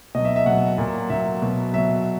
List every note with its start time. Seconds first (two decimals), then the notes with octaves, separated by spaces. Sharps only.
0.15 B2 F#3 D#5
0.25 E5
0.36 E5
0.46 B2 F#3 F#5
0.78 A#2 F#3
1.10 A#2 F#3 E5
1.42 B2 F#3
1.73 B2 F#3 E5